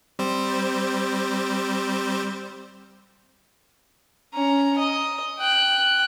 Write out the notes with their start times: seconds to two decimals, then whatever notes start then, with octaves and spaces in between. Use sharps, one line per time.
0.19 G3 C4 C5
4.34 C#4 A#5
4.78 D#5
5.39 G5 F#6